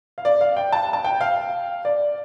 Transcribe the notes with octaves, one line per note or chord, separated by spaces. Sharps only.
F5
D5
F5
G5
A5
A5
G5
F5
D5